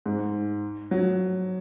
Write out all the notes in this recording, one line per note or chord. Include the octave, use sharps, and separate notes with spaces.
G#2
F#3